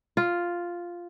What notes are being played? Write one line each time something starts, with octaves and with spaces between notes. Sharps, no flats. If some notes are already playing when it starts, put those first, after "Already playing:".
F4